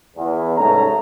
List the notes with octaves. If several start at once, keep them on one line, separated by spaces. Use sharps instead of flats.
E2
C2 G#2 A3 C#4 A4 A#5